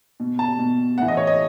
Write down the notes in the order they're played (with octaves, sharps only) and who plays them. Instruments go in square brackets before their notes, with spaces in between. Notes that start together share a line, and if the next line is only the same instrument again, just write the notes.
[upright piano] B2
A5
B2
A2 E3 F#5
D#5
C#5
D#5